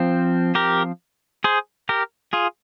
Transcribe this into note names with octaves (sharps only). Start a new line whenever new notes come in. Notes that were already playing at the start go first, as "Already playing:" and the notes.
Already playing: F3 C4
G4 A#4
G#4 C5
G4 A#4
F4 G#4